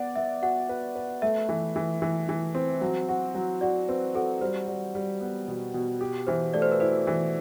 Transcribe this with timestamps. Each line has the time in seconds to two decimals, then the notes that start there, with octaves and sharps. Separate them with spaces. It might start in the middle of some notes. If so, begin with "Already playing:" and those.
Already playing: B3 D5 F#5
0.16 B3 E5
0.42 F#4 F#5
0.69 B4
0.96 B4
1.22 A3 E5
1.49 E3
1.76 E3
2.02 E3
2.29 E3
2.55 C4
2.81 F#3
3.09 F#4
3.35 F#3
3.61 F#4 D5
3.89 C4 B4
4.15 F#4 A4
4.41 G3 C5
4.67 G3
4.95 G3
5.21 B3
5.48 B2
5.74 B2
6.01 G4
6.27 E3 C5
6.54 A3 D5
6.62 C5
6.72 B4
6.80 E4 C5
7.07 E3